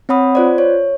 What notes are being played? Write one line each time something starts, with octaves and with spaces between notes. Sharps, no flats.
C4 C#5 F#5 B5 D#6
F4 C5 D5
C#5